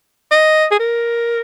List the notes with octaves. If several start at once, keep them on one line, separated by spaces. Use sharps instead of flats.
D#5
G#4
A#4